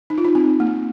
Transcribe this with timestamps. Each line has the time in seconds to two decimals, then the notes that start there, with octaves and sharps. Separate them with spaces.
0.10 D#4
0.18 F4
0.25 D#4
0.35 C4
0.60 A#3